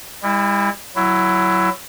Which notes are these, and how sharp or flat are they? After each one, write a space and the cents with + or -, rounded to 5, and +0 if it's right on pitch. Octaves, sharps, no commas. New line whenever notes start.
G3 +45 E4 -10
F#3 +10 E4 +20